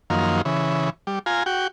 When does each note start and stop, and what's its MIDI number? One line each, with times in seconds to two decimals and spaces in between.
0.10 0.41 42
0.10 0.41 51
0.10 0.41 53
0.10 0.41 58
0.45 0.90 49
0.45 0.90 52
1.07 1.19 55
1.26 1.43 65
1.26 1.43 80
1.26 1.43 82
1.46 1.67 66
1.46 1.67 79